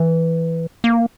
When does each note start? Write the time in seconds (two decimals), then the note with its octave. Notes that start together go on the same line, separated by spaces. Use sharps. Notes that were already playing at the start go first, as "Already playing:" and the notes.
Already playing: E3
0.84 A#3